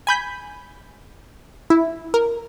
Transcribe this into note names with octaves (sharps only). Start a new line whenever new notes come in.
G#5 B5 G6 B6
E4
A#4